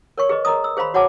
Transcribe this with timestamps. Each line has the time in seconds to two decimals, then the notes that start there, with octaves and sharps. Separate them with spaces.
0.18 A#4 C#5 C#6
0.29 G#4 B4 D#5
0.45 A#4 D#5 A#5 D#6
0.64 E6
0.77 G#4 C5 F5 B5 C6
0.94 F#4 C#5 F#5 A5 D6